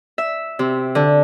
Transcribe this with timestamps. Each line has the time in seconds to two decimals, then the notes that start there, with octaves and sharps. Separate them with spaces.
0.18 E5
0.59 C3
0.95 D3